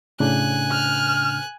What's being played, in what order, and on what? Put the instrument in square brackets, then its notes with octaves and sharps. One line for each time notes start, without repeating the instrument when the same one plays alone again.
[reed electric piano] A2 C#3 D4 [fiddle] G#5 F#6
[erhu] F6